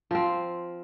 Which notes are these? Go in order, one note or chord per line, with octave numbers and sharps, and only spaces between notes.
F3 C4